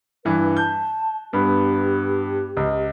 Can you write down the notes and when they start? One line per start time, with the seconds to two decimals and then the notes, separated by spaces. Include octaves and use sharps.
0.25 G2 E3 B4
0.57 A5 G6
1.33 G2 B3 G4 B5
2.57 C#2